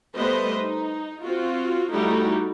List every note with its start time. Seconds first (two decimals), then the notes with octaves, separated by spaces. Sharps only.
0.16 G3 A3 B3 B4 C5 D#5
0.61 D#4
1.23 C4 F4 F#4
1.91 G3 A3 D#4 E4 F#4